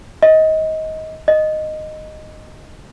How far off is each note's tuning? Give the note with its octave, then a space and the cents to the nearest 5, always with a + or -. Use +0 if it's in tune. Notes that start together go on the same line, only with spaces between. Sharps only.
D#5 +20
D#5 -5